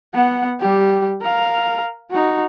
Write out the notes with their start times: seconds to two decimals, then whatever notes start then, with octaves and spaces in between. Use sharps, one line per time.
0.14 B3 F#5
0.60 G3 G4
1.22 A#4 F5
2.11 D#4 F#4